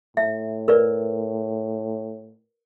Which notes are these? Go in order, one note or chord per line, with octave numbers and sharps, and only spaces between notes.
A2 E5
A#4 B4 D5